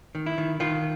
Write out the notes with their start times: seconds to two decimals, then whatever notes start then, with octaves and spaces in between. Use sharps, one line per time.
0.15 D#3
0.26 E4
0.38 D#3
0.60 D#3 F4